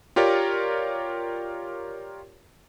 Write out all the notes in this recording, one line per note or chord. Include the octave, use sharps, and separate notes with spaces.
F4 G4 A#4 C#5 D5